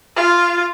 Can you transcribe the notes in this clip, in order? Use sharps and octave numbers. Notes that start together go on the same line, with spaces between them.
F4